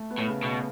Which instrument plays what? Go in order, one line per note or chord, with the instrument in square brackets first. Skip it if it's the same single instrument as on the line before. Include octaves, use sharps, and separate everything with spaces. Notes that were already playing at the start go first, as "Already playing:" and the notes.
Already playing: [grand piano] A3
B3
[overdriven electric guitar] A2
[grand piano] C#3
[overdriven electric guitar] B2